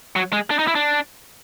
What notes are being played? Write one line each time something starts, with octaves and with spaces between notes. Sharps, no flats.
F#3
G#3
D4
D#4
E4
D4